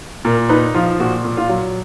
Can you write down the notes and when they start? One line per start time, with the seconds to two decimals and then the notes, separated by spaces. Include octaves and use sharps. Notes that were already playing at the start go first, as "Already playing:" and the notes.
0.25 A#2 A#4
0.49 D#4 B4
0.74 F3 F4
1.00 A#2 F#4
1.25 A#2
1.37 F4
1.49 F#3